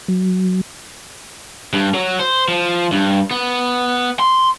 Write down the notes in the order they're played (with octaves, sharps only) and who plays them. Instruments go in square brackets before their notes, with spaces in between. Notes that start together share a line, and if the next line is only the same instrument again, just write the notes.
[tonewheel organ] F#3
[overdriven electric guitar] G2
F#3
C5
F3
G2
B3
C6